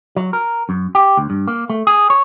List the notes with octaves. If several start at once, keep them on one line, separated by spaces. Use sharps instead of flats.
F#3
A#4
F#2
G4
D2
G2
A#3
A3
G#4
C#5